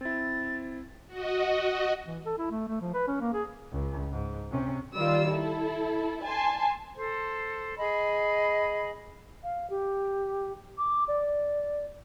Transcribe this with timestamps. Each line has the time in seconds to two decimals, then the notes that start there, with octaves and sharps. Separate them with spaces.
0.01 C4 E4 A6
1.07 F#4 D#5
2.07 E3
2.26 A4
2.38 E4
2.51 A3
2.68 A3
2.81 F3
2.94 B4
3.08 C#4
3.21 A#3
3.34 G#4
3.72 C#2
4.11 G#2
4.50 C3 C#4
4.96 D#3 G3 F4 D5 E6
5.31 E4 A4
6.24 G#5 A5 C6
6.95 A4 C5
7.78 G#4 D#5 G#5 B5
9.43 F5
9.70 G4
10.78 D6
11.08 D5